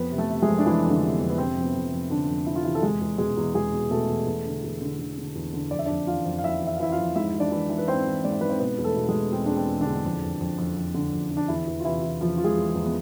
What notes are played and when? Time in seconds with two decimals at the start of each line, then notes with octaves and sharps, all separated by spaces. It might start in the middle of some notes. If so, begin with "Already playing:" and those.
Already playing: F2 B3 B4
0.12 C3
0.18 A3 A4
0.30 C3
0.42 G#3 G#4
0.48 F2
0.58 D4
0.66 F2 E3 E4
0.84 F2
0.90 D3 D4
1.02 C3
1.14 B3
1.20 F2
1.30 B3
1.38 C3 C4
1.57 F2
1.63 B3
1.75 F2
1.92 F2
2.10 F2 D3 D4
2.29 F2
2.46 C3 E4
2.55 F4
2.64 C3 E3 E4
2.75 A4
2.83 E2 G#3 G#4
3.01 E2
3.18 B2 G#3 G#4
3.37 E2
3.54 E2 G#3 G#4
3.73 B2
3.91 B2 A3 A4
4.09 E2
4.27 E2
4.45 D3
4.63 E2
4.82 D3
4.99 D3
5.17 D3
5.35 E2
5.54 D3
5.71 F2 D5
5.79 E5
5.86 F2 D4 D5
6.07 E3 F4 F5
6.25 F2
6.38 F5
6.43 F2 E4 E5
6.62 E3
6.67 E5
6.75 F5
6.80 E3 E4 E5
6.92 F4 F5
6.98 F2
7.16 G#2 E4 E5
7.34 E3
7.40 D4 D5
7.51 E3
7.69 E3
7.78 B4
7.88 G#2 C4 C5
8.07 E3
8.24 G#2 D5
8.32 C5
8.41 G#2 B4
8.50 C4 C5
8.60 B2 B3 B4
8.78 E2
8.84 A3 A4
8.96 B2
9.08 G#3 G#4
9.14 E2
9.32 E2 C4
9.46 E2 D4
9.56 C4
9.68 E2
9.80 D3 D4
9.87 E2
10.05 F2
10.23 F2
10.41 F2
10.58 F2
10.76 F2
10.94 D3
11.13 F2
11.31 D3
11.37 D4
11.48 E2 E3 E4
11.67 E2
11.80 F4
11.85 C3 E3 E4
12.03 E3
12.21 E2 F3 F4
12.37 C3 F4
12.44 G#3 G#4
12.57 E2
12.69 F3 F4
12.74 E2
12.86 B3